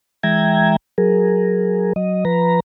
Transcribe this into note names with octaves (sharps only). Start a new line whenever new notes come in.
E3 G#3 E5 G5 A#5 G#6
F#3 G#4 A#4
F#3 D#5
F3 B4 A#5